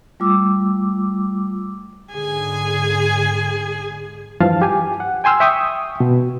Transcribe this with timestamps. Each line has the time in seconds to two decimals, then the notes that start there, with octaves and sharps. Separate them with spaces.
0.20 G3 A3 F4 D6 E6
2.13 G#2 D3 G#4 G#5
4.40 G2 E3 F3 F5 A5
4.62 G4 G#5
5.00 F#5
5.24 G5 G#5 C6 E6 F6
5.40 E5 G5 C#6 D#6
6.00 B2